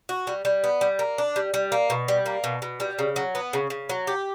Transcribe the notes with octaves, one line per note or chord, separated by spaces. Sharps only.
F#4
G3
G3
B3
G3
A#3
D4
G3
G3
A#3
B2
G3
A#3
B2
B2
G3
C#3
F#3
B3
C#3
C#3
F#3
G4